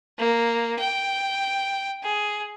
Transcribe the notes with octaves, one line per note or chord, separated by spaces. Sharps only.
A#3
G5
G#4